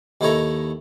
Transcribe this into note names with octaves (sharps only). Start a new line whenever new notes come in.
D#2 D#3 E4 A4 C#5 A#5